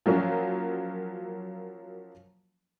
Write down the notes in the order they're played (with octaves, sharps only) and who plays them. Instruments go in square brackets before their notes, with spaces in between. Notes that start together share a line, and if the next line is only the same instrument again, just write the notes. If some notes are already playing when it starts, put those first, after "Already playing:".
[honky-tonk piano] F3 F#3 A#3 C#4